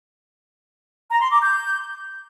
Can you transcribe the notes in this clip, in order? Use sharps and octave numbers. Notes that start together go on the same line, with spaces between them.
A#5
C6
D6
G6